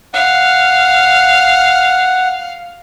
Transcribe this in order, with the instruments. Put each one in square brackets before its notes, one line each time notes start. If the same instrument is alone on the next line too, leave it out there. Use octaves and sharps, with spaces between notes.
[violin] F5 [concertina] F#5